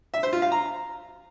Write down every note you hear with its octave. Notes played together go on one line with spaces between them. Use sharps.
E5
C5
F4
F5
A#5